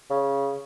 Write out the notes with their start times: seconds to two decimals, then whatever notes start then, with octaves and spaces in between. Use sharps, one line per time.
0.10 C#3